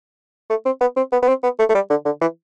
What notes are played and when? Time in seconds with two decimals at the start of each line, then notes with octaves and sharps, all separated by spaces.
0.50 A3
0.65 C4
0.81 B3
0.96 C4
1.12 B3
1.22 B3
1.28 C4
1.43 B3
1.59 A3
1.69 A3
1.74 G3
1.90 D3
2.05 D3
2.21 E3